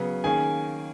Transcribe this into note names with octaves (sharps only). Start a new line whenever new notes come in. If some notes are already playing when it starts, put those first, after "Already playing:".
Already playing: C#3 F#3 B3
D#3 A#3 C#4 G#4 G#5